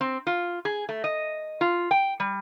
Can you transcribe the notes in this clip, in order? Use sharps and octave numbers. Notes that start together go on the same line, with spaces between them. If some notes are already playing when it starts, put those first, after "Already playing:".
C4
F4
G#4
A3
D#5
F4
G5
G3